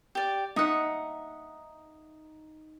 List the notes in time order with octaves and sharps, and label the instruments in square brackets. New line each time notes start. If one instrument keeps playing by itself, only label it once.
[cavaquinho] G4 D5
[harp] D#4 D#6 [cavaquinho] E5 F#5